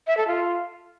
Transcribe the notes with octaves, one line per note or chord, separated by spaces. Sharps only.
E5
A4
F4